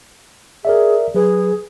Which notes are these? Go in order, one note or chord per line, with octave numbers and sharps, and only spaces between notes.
G#4 A#4 D5 E5
F#3 G#4 B4